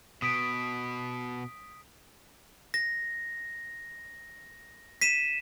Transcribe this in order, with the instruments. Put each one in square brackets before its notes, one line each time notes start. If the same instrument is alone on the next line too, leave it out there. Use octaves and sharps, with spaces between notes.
[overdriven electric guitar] B2 [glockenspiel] D#6 B6 D7
[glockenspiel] A#6
B6 D#7 E7